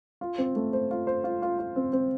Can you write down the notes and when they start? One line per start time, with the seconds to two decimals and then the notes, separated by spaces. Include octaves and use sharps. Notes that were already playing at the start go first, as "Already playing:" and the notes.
0.21 F4
0.38 C4
0.56 A3
0.73 C5
0.91 F4
1.07 C5
1.24 F4
1.42 F4
1.59 F4
1.76 C4
1.93 C4